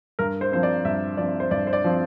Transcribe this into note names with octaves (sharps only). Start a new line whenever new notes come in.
G2 A#4
C5
F3 C4 C5
D5
G2 E5
F3 C4 D5
C5
G2 D5
C5
D5
F3 C4